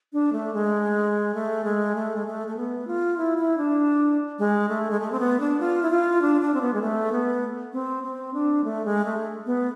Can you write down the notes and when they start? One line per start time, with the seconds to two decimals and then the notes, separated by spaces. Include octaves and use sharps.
0.13 D4
0.33 A3
0.54 G#3
1.35 A3
1.64 G#3
1.95 A3
2.16 G#3
2.26 A3
2.47 A3
2.56 B3
2.87 F4
3.18 E4
3.38 E4
3.58 D4
4.39 G#3
4.69 A3
4.91 G#3
5.00 A3
5.12 C4
5.20 B3
5.40 D4
5.60 F4
5.83 E4
5.90 F4
6.22 D4
6.41 D4
6.54 C4
6.61 B3
6.74 G#3
6.82 A3
7.12 B3
7.73 C4
8.03 C4
8.34 D4
8.64 A3
8.85 G#3
9.05 A3
9.46 B3